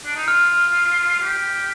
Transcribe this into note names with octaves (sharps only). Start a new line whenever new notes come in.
D4
D#4
F4 F6
G4